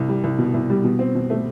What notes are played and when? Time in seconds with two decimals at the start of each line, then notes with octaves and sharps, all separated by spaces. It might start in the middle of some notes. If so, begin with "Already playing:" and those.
Already playing: C2
0.09 G3
0.24 C2
0.39 B2
0.54 C2
0.70 G3
0.84 B2
0.99 C4
1.15 B2
1.30 A3